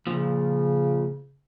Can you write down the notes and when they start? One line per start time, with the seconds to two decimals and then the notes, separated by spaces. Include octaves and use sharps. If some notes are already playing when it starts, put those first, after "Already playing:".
0.07 A#2 C#3 F3